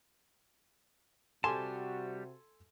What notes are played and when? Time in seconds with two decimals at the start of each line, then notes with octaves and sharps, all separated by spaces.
1.44 C3 G3 F#4 G4 A4 G#5 A5 C6